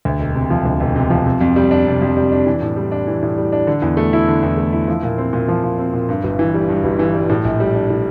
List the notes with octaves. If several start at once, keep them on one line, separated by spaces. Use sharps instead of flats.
D2
E1
C3
F3
D2
E1
C3
F3
C3
F2
G3
D4
C3
F2
G3
D4
E3
A2
G3
D4
E3
A2
G3
D4
D3
E2
A3
E4
D3
E2
A3
E4
F3
A#2
C4
A#2
F3
A#2
C4
A#2
G2
G1
E3
G3
G2
G1
E3
G3
A2
A#1
G3
D4
A2